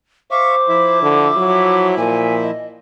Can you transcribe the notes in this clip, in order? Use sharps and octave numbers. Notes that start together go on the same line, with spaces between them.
C5 E5 F5 C#6 D6
F3 E4 E5
D3
F#3
A#2 G#5
D#5